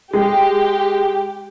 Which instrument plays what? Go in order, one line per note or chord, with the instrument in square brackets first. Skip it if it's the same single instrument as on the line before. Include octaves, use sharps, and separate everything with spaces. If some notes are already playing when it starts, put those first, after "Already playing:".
[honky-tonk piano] G#3 [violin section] G4